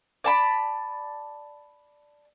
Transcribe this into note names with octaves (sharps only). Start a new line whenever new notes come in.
D5 A5 B5